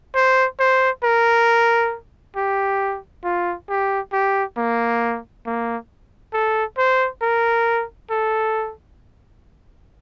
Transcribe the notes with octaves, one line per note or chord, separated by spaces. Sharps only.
C5
C5
A#4
G4
F4
G4
G4
A#3
A#3
A4
C5
A#4
A4